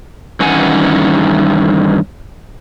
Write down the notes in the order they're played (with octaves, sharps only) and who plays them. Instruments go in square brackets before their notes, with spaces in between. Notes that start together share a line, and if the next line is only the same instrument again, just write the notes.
[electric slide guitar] G2 D#3 E3 C#4 F#5 G#5